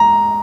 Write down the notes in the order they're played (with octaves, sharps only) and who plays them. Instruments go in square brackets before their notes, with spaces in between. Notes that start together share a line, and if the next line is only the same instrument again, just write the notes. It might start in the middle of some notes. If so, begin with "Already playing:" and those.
Already playing: [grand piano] G#3 A#5